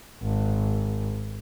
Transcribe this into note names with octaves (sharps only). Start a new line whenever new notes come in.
G#1